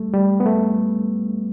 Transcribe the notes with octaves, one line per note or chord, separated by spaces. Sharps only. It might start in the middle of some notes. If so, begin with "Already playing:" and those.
Already playing: G3 A3
G3
B3
A3